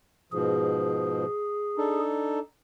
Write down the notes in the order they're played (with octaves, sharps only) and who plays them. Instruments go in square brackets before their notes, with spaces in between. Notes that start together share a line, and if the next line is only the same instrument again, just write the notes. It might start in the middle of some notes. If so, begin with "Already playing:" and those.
[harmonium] G#2 B2 F3 [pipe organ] G#4
[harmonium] D4 D#4 A4